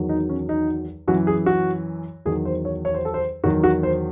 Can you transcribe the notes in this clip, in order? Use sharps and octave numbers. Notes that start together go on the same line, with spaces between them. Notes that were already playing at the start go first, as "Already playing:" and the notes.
Already playing: E2 D#3 F#3
D#4
C#4
D#4
F#2 E3 F#4
G#4
F#4
E2 D#3 F#3 G#4
C5
C#5
C#5
C5
A4
C5
E2 D#3 F#3 F#4
F#4
C5